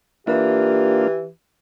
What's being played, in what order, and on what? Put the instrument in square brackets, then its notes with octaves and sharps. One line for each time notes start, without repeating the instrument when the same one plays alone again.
[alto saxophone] E3 [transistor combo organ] A#3 D4 F4 [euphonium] G4